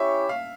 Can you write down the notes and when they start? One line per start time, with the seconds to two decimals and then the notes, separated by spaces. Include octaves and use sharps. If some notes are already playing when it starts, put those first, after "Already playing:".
Already playing: C#4 E4 G4 C#5 E5
0.29 F5